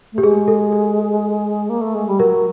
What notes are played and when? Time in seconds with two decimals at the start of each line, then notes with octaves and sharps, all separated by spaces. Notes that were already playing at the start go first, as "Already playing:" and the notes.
0.13 A3
0.18 G4
0.23 G#3 G#4
0.48 A4
0.72 G#4
1.69 A#3
1.81 A3
1.94 G#3
2.07 G3
2.19 F#3 A#4